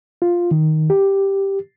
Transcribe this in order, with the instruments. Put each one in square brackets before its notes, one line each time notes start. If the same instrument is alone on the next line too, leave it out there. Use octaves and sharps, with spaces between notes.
[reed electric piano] F4
D#3
G4